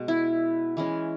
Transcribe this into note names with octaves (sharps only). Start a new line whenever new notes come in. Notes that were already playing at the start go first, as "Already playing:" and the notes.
Already playing: B2 G#3
E4
E3 G#3 C#4